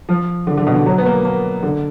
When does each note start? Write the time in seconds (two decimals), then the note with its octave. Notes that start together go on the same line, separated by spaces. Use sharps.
0.09 F3
0.47 D3
0.57 D3
0.67 B2
0.76 D3
0.86 F#3
0.98 B3
1.06 A#3
1.25 A#3
1.63 D3